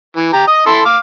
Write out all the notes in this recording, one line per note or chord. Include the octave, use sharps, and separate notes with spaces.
E3
G4 A#5
D#5 D#6
E4 A4 C6
F5 D6